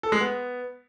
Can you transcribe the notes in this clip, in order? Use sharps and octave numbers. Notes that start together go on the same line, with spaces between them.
A4
G#3
B3